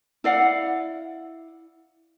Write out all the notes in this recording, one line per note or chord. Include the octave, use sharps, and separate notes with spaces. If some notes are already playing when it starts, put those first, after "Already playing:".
E4 D5 F5 F#5